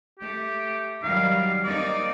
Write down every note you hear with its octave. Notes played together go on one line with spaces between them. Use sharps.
A3 G4
D#3 F#3 G3 F5
A#3 C4 D#4 D5